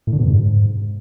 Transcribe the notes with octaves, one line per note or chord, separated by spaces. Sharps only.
A2
D3
B2
F#2
G#2